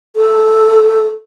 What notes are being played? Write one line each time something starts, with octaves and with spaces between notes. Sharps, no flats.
A4